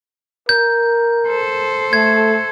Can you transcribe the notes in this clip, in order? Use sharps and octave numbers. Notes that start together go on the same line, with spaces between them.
A#4 G6
A4 C5
A3 G#6